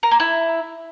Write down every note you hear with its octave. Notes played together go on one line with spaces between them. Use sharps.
A#4
A#3
E4